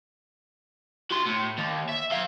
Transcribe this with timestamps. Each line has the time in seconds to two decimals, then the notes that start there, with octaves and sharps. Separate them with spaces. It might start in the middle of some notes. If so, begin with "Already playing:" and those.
1.11 F#4 C6
1.27 A2
1.59 D#2
1.89 E5
2.12 A4 F5